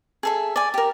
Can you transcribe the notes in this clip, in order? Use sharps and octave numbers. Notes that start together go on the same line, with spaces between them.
G#4 A4 E5
D5 G#5
G4 A#4